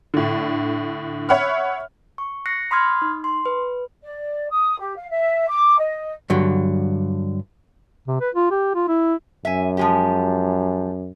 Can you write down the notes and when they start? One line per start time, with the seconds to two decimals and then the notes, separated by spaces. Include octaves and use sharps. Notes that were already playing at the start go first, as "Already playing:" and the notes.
0.14 A2 D3
1.29 C#5 E5 F#5 B5 C#6 F6
2.18 C#6
2.46 F#6 A#6 C7 C#7
2.71 B5 C6 D#6 F6 G#6
3.02 D#4
3.24 C6
3.46 B4
4.02 D5
4.50 D#6
4.79 G4
4.96 F5
5.10 E5
5.48 D6
5.77 D#5
6.30 G2 D3 F#3
8.08 C3
8.21 B4
8.35 F4
8.51 G4
8.75 F4
8.88 E4
9.45 F#2 E5 G#5
9.77 F3 G#3 G4